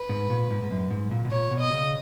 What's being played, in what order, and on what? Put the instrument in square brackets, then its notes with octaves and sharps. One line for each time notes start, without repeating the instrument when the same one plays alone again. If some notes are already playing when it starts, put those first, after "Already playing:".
Already playing: [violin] B4
[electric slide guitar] G#2
A#2
G#2
G#2
F#2
G#2
A#2
B2
[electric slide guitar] A#2 [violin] C#5
[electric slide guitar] B2
[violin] D#5
[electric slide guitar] C#3